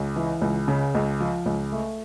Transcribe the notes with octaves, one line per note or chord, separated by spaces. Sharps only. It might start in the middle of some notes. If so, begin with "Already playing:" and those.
Already playing: C#2
E3
C#2
C#3
C#2
F3
C#2
A3